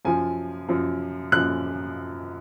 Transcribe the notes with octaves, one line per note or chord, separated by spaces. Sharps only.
F#2 F3 G#5
F#2 F3
F#2 F3 F#6